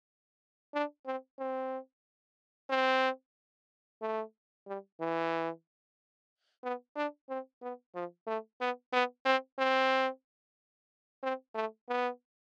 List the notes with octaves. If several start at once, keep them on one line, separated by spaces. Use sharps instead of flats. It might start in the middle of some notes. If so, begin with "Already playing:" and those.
D4
C4
C4
C4
A3
G3
E3
B3
D4
C4
B3
F3
A3
B3
B3
C4
C4
C4
A3
B3